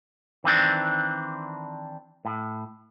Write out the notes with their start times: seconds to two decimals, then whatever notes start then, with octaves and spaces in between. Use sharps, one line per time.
0.44 D#3 E3 C4 D4
2.25 A2